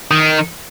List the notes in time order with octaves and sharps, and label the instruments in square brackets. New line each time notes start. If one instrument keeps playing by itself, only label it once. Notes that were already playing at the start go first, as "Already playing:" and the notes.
[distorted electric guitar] D#3